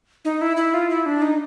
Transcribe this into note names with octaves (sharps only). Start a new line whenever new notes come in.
D#4
E4
E4
F4
E4
D4
D#4